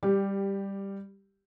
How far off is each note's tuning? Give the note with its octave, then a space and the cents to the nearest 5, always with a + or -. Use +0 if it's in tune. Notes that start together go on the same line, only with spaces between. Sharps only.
G3 +10 G4 +0